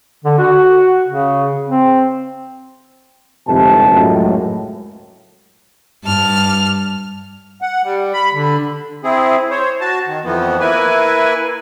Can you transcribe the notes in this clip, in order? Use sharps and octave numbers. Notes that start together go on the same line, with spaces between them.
D3
F#4
C#3
C4
G1 F2 G#2 C3 A5
C#2 F#2 A2
G2 A5 F6
F#5
G3
B5
D3
C4 E4 G#4
C5 C#5
F#4 A5
D#3
F2 E3 F3 B3
A#3 E4 B4 G#5